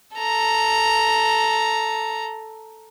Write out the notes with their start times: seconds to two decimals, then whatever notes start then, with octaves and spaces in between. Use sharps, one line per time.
0.17 A4 A#5